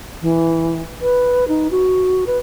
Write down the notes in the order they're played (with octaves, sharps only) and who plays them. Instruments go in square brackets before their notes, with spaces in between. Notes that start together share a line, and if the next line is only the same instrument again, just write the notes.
[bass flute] E3
B4
D#4
F#4
B4